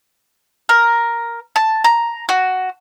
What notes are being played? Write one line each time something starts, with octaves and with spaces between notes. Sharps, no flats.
A#4
A5
A#5
F#4